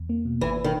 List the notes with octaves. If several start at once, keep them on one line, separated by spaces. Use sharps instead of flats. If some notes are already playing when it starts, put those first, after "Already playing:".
Already playing: E2
A#3
B2
G#1 E3
D#3